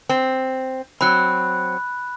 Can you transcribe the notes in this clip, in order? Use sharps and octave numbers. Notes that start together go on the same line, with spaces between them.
C4
F#3 C4 B5 F#6